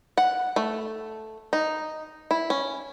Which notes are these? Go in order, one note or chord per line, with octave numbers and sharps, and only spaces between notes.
F#5
A3
D#4
E4
C#4